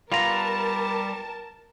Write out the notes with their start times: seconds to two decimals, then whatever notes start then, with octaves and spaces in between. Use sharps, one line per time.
0.12 G3 B3 F4 A#4 A5 A#5